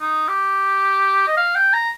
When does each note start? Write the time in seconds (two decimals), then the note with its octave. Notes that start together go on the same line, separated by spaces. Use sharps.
0.01 D#4
0.28 G4
1.28 D#5
1.37 F5
1.55 G5
1.73 A#5